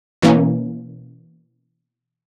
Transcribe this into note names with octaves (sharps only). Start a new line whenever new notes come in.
B2 E3 A#3 C#4